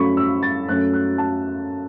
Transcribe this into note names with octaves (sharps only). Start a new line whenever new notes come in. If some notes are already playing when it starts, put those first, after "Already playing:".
Already playing: F#2 F#3 A3 C#4 B5 C#6
E6
A6
F#2 F#3 A3 C#4 F#6
F#6
A5